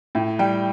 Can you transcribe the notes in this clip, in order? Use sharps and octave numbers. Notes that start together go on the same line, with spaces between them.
A2 G5
G3 G5